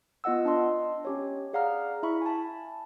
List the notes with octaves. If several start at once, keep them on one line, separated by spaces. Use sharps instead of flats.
B3 F4 D#5 F#5 E6
D4 D#5 A5 C6
C#4 G4 C#5
G#4 D5 F5 F#5 A#5 F6
E4 E5 B5 C#6
G#5 A5